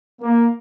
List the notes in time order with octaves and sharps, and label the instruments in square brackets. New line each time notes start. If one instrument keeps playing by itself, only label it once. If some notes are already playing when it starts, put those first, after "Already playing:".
[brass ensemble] A#3